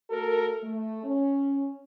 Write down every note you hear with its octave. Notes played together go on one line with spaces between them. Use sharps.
A3 F#4 A4 A#4
A3
C#4